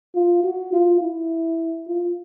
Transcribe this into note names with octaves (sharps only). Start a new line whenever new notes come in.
F4
F#4
F4
E4
F4